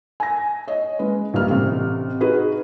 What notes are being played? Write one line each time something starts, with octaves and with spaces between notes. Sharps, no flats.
G#5 A#6
C#5 D#5
G#3 C#4 B4
A#1 G2 A#2 G3 F6
A1 C3
D#4 F#4 G#4 B4